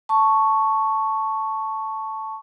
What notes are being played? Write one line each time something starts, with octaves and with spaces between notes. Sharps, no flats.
A5 C#6